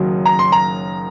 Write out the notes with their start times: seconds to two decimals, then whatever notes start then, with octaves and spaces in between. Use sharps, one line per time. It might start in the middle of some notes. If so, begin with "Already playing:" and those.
Already playing: F#1 F#2 D#3 F#3
0.26 A#5
0.39 C6
0.52 A#5